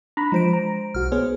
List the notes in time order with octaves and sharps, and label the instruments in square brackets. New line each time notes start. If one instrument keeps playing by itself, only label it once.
[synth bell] D4 [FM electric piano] A#5 B5
[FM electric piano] F3 [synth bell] G#3 C5 D7
[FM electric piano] A#5
[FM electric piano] B1 F#4 [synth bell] F6
[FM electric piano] B3 G#4 C5 [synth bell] C#5